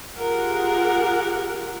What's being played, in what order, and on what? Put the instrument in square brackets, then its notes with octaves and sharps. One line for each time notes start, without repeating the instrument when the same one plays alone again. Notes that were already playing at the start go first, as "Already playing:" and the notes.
[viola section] F4 G4 G#4 A#4 F#5